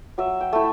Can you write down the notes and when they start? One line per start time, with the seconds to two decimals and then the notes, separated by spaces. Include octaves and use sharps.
0.18 F#3 E5
0.41 G5
0.53 A3 E4